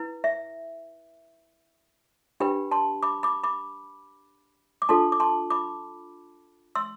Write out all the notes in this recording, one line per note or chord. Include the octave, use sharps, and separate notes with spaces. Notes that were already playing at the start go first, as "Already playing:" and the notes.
Already playing: E4 B4
E5
D4 G4 B4 G5 B5
A5 C6
B5 D6
B5 D6
B5 D6
D6
D4 F4 A4 A5 C6
D6
A5 C6
B5 D6
C6 E6